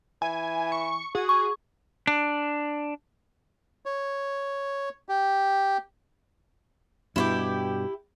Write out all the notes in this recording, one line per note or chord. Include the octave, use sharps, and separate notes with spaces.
E3 G#5
C#6
F#4 G#4
C#6
D4
C#5
G4
G2 B2 E4 F4 G4